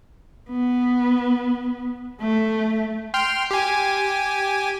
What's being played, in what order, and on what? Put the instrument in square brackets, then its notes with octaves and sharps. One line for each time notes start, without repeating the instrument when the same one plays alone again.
[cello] B3
A3
[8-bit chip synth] G5 C6 F6
G4 G#5